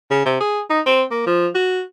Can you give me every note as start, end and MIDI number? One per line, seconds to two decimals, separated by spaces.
0.11 0.25 49
0.26 0.37 48
0.41 0.60 68
0.70 0.81 63
0.86 1.03 60
1.11 1.26 58
1.27 1.47 53
1.55 1.82 66